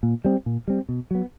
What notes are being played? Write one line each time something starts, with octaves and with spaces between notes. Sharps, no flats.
A#2
G3 C4
A#2
G3 C4
B2
F#3 B3